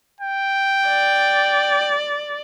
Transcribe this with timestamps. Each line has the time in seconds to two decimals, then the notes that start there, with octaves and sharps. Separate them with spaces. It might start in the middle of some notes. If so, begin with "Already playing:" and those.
0.21 G5
0.89 D5